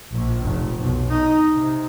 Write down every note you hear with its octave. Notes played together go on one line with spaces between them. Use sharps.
A#1
F1
B1
D#4
C3